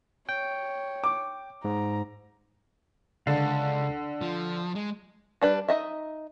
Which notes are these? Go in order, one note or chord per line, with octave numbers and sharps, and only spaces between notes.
C#5 G5
D6
G#2 A#5
C#2 D3 F5 F#5 A5
F3
G#3
G3 D4 B4
D#4 D#5 E5